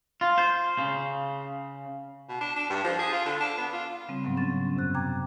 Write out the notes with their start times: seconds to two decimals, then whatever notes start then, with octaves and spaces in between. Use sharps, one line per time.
0.21 F4
0.38 C5
0.78 C#3
2.29 B2
2.41 D4
2.56 D4
2.70 G2
2.84 F3
2.99 G#4
3.12 F4
3.25 D3
3.40 D4
3.58 B3
3.73 F4
4.08 C#3 G3 C4
4.24 G#2 F#3 B3 C4
4.37 C#4 A6
4.50 C#3
4.77 F#2 C3 F#6
4.95 G5 A#5 D6 G#6